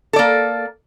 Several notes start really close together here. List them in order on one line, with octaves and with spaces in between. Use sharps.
A4 D5 A#3